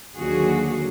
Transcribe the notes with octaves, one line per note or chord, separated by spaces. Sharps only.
D#2 D3 F#3 F#4 G#4